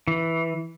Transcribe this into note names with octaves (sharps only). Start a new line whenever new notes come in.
E3